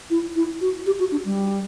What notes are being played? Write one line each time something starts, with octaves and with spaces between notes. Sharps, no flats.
E4
E4
F#4
G4
F#4
D4
G3